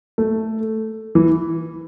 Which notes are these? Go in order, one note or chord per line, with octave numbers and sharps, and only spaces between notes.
A3
E3